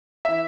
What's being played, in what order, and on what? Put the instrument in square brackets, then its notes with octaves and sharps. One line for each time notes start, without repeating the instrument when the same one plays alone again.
[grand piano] E3 E5